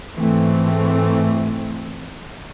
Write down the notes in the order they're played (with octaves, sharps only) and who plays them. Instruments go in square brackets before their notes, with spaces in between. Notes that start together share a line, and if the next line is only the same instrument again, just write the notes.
[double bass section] G#2 E3 A3 C4